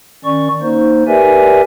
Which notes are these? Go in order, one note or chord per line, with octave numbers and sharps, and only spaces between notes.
D#3 C#4 D5 C#6
A#3 D#4 C5
G4 A#4 B4 D5 E5 G#5